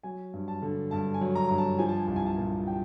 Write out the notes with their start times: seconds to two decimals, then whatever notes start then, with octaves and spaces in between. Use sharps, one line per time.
0.03 F#3 G#5
0.33 G2
0.48 A5
0.62 D3
0.91 G2 A5
1.14 G#5
1.21 F#3
1.35 A#5
1.49 G2 A#5
1.58 A5
1.79 F3 G#5
1.89 A5
1.98 G#5
2.07 C2 A5
2.16 G#5
2.26 A5
2.35 A#2 G#5
2.67 G5